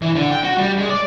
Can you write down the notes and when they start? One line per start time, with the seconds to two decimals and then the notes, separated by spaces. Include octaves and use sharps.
0.02 E3
0.16 D3
0.31 G5
0.44 F#4
0.58 G3
0.78 G#3
0.90 D5